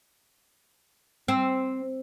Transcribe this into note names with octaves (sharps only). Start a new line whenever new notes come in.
C4